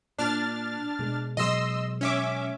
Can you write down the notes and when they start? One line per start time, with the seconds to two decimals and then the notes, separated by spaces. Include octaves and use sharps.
0.19 A#2 D4 F6 A6
0.99 B2 G#3
1.37 B2 F#3 G#3 D#5 C6 E6
2.01 C#4 E5 D6